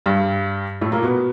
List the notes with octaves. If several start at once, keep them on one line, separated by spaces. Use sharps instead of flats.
G2 G3
A2 A3
A#2 A#3
B2 B3